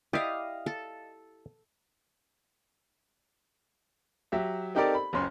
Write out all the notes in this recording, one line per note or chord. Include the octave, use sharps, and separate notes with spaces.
E4 G4 D5 D#5 F5
A4
F#3 G4 E5
C4 D#4 G4 A4 A#4 D5
B5
F#1 C#2 C#4 C6